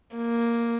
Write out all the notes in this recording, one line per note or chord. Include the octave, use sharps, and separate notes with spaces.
A#3